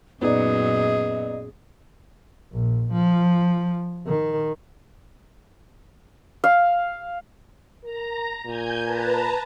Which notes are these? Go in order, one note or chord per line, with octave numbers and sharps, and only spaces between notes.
F#2 A#2 F#3 B3 D#4 G#4 D5 D#5
A#1
F3
D#3
F5
A#4 A#5
A#2 G#5 G6 G#6
B4 A5 A#5